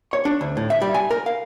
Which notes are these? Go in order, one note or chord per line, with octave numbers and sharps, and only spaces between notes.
C#5
D4
D2
A2
E5
G3
G#5
A#4
F5